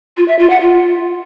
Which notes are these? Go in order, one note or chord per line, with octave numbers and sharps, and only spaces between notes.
F4
E5
F4
F#5
F4